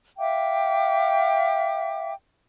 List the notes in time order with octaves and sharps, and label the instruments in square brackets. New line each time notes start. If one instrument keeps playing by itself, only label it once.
[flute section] E5 F5 G5 D6